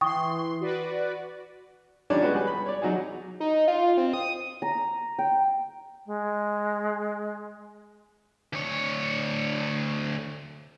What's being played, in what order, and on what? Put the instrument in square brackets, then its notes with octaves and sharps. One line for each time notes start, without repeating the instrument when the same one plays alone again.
[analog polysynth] E3 C6 [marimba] G5 C#6 D#6
[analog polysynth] F#4 B4 D5
[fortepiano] D#3 F3 G3 C#4 D4 C#5
G#3 B3 C#4 F#4
G3 G#4 B4
B5
C#5 D5
F#3 D#4 F#4 G#4
[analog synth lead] D#4
F4
C4
D#6
[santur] A#5
G5
[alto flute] G#3
[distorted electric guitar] D2 C#5